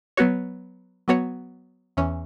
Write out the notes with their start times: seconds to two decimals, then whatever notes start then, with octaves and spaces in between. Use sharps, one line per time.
0.17 F#3 B3 F#4 C#5
1.08 F#3 B3 F#4 C#5
1.97 E2 E3 C#4